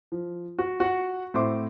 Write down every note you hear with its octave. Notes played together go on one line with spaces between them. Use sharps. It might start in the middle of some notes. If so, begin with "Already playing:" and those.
F3
F#4
F#4 F#5
A2 C4 C5 E5 C6 D6